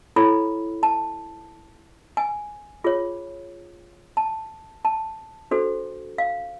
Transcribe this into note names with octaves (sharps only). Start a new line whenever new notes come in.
E4 A4 C#5 B5
A5
G#5
F4 G#4 C#5
A5
A5
D4 F#4 A4 C5
F5